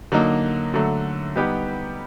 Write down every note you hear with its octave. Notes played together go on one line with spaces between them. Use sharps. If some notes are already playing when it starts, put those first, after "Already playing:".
D3 F#3 A#3 D#4
D3 F#3 A3
G3 B3 D#4 G4